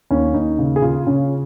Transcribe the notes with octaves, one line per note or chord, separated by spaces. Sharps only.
D#2 C#4
D#2 D#4
C#3
G#4
C#3 F4
C#3 C#4